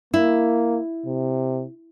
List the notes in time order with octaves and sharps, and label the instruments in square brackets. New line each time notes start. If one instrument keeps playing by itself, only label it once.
[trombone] A#3 [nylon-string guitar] E4
[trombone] C3